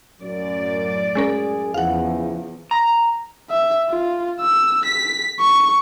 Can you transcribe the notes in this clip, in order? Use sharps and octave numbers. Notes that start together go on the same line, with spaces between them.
F#2 A2 D5
F#2 G#3 C#4 G#4 A#4
E2 C#3 E3 F3 F5 F#5
A#5
E5
F4
E6
B6
C#6